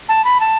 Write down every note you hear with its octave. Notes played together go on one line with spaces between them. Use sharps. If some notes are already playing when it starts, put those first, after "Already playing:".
A5
B5
A5